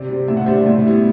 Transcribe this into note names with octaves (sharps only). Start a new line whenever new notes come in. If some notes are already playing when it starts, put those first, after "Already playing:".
Already playing: C3 D5
G3 C4
A2 E5
F#5
G3 D4 C5 E5
A2
G3 B3 E4